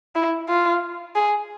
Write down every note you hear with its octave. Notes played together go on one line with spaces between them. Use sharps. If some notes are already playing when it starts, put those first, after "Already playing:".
E4
F4
G#4